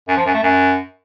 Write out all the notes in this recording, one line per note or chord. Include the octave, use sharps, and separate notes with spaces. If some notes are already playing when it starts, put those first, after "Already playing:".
F#2
F3
F#2
A3
F#2